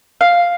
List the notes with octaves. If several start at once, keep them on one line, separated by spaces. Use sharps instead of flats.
F5